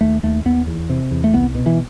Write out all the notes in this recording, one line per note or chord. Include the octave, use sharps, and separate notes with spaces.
D#2 A3
D#2 A3
D#2 B3
E2
C3
E2
A3
C2 B3
B2
E3